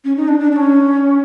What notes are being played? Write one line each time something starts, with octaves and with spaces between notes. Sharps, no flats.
C#4
D#4
D4
D4
D4
C#4